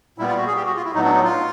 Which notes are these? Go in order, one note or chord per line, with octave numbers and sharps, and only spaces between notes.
A#2 G3 B3 E4
F4
F#4
G#4
G4
F#4
F4
E4
A2 F#3 B3 D#4
D4
D#4
F4